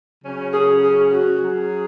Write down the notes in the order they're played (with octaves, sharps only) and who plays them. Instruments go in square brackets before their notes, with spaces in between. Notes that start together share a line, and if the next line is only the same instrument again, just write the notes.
[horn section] C#3 F#3 C#4
[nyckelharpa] G#4
G#4
F#4
[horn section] F#3 C#4 G#4